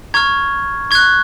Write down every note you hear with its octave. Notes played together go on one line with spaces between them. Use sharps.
A#5 C#6 F6 G#6
C#6 F#6 G#6